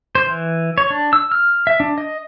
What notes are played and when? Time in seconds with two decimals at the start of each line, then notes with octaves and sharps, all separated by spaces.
0.15 C5
0.27 E3
0.78 C#5
0.90 D4
1.13 E6
1.32 F6
1.67 E5
1.80 D4
1.98 D#5